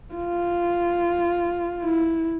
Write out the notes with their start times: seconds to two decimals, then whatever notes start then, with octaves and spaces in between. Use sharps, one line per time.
0.15 F4
1.84 E4